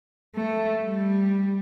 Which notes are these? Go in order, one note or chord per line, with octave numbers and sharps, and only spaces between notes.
A3
G3